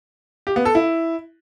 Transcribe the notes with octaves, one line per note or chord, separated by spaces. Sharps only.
G4
B3
A4
E4